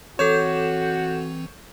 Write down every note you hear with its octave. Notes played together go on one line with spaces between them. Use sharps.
E3 C4 F#4 A4 C#5 G6 E7